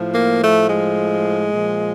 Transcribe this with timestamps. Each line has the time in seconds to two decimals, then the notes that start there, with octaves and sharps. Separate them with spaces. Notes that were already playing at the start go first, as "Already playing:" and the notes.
Already playing: A2 F3
0.12 A#3
0.40 A3
0.67 G#3
1.51 A#2 F3